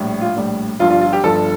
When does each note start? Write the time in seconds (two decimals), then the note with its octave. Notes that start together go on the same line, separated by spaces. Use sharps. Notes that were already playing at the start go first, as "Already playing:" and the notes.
Already playing: A#1 A2 G3
0.21 F4
0.36 A#1 A2 G3
0.79 G1 G2 F3 F4
0.90 F4
1.01 F4
1.13 G4
1.23 G1 G2 F3 A4